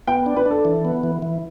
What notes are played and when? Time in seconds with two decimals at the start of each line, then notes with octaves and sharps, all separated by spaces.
0.07 B3 G5
0.26 D4
0.36 B4
0.46 D4 A4
0.65 E3
0.85 B3
1.04 E3
1.22 E3